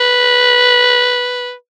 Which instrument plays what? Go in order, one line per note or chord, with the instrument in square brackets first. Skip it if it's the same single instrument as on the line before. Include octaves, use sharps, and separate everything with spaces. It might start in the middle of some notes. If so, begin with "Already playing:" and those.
Already playing: [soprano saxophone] B4